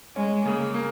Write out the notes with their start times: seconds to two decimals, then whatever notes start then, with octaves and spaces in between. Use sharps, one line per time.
0.16 G#3 C#4
0.45 C#3 A#3
0.74 A#3